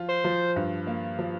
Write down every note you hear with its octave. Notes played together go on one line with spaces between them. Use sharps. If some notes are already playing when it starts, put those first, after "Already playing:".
Already playing: F3 F4
C5
F3
G2
A#3
F3